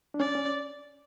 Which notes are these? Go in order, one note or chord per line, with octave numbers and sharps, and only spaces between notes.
D4
C#4 D5
C#4